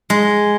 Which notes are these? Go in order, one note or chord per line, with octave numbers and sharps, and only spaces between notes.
G#3